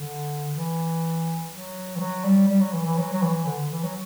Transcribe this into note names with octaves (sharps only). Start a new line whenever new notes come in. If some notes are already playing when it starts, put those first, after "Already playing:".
Already playing: D3
E3
F#3
E3
F#3
G3
G3
F#3
E3
E3
F#3
F#3
E3
D3
E3
F#3